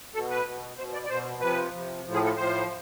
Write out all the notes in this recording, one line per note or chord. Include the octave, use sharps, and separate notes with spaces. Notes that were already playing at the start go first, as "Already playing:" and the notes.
B2 A4
B4
B2
B2 C5
D5
D5
B2 C5
C3 F3 B4
C3 F3
A2 F3
G#4
A4
A2 F3 C5